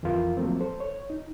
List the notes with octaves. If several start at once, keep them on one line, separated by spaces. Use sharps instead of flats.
F2 E3 F3 F4 A#4 F5
F3 F#3 A3 A#3 C4
A4 C5
C#5
D#4